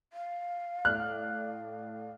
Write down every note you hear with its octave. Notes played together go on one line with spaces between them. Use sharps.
F5
A2 D5 F6 F#6